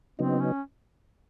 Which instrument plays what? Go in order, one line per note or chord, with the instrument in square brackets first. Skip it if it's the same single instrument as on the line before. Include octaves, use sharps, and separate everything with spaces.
[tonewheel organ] C#3 F#3 B3 D#4 [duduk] C4
[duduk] C#4